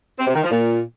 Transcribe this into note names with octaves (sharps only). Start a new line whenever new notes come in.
C4
C3
D#3
F3
A#2